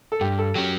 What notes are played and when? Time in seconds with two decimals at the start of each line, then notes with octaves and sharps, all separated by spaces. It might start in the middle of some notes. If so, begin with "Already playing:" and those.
0.12 A4
0.21 G2 G4
0.39 A4
0.55 F#3 C#4 G4